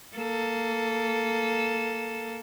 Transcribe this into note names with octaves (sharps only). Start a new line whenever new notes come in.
A#3 A4